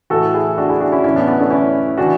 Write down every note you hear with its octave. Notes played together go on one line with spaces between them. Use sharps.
A2 E3 F#4 A4
E4 G#4
D4 F#4
E4 G#4
D4 F#4
C#4 E4
A2 E3 C#4 E4
B3 D4
B3 D4
A3 C#4
C#4 E4
E3 D4 F#4